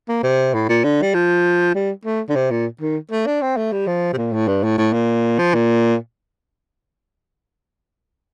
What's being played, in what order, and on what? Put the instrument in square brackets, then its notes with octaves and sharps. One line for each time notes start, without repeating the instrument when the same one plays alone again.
[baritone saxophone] A#3
C3
A2
A#2
D3
G3
F3
G3
A3
D3
C3
A#2
D#3
A3
D4
C4
A3
G3
F3
C3
A#2
A2
G2
A2
A2
A#2
F3
A#2